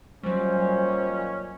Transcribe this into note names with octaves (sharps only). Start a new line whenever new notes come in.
A#2 D#3 F#3 G3 C#4 C5